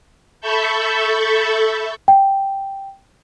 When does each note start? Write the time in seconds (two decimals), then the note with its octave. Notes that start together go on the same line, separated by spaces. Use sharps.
0.41 A4 E5 A5 B5 C#6 G6
2.08 G5